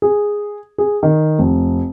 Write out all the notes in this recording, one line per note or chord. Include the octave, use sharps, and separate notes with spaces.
G#4
G#4
D#3
F1